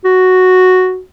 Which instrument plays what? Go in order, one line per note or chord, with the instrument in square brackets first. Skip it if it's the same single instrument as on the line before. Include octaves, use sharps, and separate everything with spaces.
[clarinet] F#4